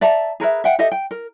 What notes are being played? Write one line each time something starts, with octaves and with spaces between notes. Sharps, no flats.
D5 E5 A5 A#5
G#4 A#4 B4 E5
E5 F#5 G5
G4 A4 D#5 E5
G5
A#4